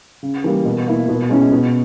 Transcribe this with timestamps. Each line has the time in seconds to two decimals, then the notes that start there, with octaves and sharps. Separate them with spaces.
0.23 C#3
0.44 E3 G3 A#3
0.65 B2
0.87 A#3 E4
1.08 B2
1.29 G#3 C#4 E4
1.51 B2